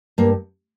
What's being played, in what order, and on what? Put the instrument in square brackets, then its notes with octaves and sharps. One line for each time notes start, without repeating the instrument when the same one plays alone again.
[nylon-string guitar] G2 A#3